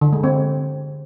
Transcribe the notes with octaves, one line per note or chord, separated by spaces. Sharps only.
D3
G#3
C4